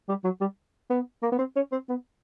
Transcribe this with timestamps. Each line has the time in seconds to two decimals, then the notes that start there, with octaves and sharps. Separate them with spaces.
0.09 G3
0.24 F#3
0.41 G3
0.90 B3
1.23 A#3
1.32 B3
1.39 C4
1.56 C#4
1.72 C4
1.89 B3